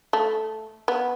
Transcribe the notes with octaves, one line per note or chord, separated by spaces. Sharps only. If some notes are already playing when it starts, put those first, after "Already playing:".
A3
B3